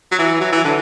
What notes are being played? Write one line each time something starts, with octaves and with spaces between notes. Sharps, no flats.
F#3
E3
F#3
E3
D3